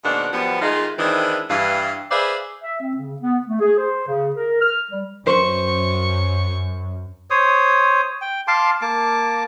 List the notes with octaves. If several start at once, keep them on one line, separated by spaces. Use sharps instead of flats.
G#2 B2 D#3 A#3 D4 F#5
F#2 F3 G3 B3
D#3 G#3 A3 D#4 F4
D#3 E3 G#3 C4 D4 E4
G2 E3 F5
G#4 B4 C5 D5 E5 F5
E5
C4
C#3
B3
A3
G#4
C5
C#3
A#4
F6
G3
F#2 C5 C#6
C5 C#5 D#6
G5
F5 A5 C6 D6
A#3 A5 D6